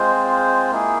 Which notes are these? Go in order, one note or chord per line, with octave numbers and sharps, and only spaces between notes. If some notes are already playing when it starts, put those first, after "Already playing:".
Already playing: G#3 C4 F4 C5
A#3 E4 G#4